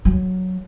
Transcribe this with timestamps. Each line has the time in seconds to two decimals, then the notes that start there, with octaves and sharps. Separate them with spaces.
0.05 F#3